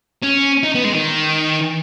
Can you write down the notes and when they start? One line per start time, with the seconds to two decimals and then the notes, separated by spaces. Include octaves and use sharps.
0.23 C#4
0.64 D#4
0.75 B3
0.84 G#3
0.93 D#3